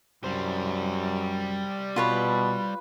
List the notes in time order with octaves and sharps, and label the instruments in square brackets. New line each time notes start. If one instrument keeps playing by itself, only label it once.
[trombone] F#2 [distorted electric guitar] G3 C5
[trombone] B2 [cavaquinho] F4 B4 C#5